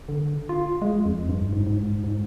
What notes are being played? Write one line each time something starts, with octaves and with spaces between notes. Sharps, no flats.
D3
F4
G#3
F2
G2
G#2
G#2
G#2